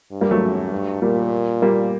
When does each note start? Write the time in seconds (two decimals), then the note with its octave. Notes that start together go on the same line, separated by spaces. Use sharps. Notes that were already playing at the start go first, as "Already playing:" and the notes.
0.11 G2
0.21 G3 A#3
0.31 F#3 A3
0.41 F#2
0.71 G2
1.02 A#2 G3 A#3
1.62 G3 A#3